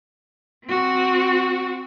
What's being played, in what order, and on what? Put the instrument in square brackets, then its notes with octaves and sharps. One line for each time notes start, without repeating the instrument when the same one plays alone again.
[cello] C4 F#4